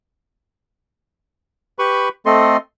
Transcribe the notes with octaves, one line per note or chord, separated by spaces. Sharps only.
G4 B4 B5 C#6
A3 C4 A4 D#5 C6